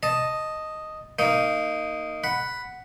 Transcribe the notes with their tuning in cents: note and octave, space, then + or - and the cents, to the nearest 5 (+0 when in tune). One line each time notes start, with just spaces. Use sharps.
D#5 +0 A5 +5
A#3 -20 D#4 +0
F#5 +0 B5 +0